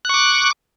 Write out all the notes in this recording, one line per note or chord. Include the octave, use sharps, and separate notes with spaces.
C#6 D6 F#6